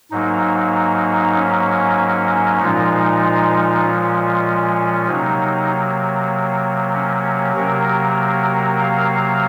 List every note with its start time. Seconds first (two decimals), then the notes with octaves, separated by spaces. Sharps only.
0.11 G#2 F#3 A#3 D#4
1.35 C#4
2.59 A#2 F3 G#3 D#4
3.83 C#4
5.07 C3 F#3 A#3 D#4
6.94 C#4
7.56 C3 F#3 A#3 A#4
8.80 F5